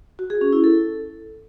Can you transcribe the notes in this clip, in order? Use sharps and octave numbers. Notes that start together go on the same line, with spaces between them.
F#4
G#4
C#4
E4
A4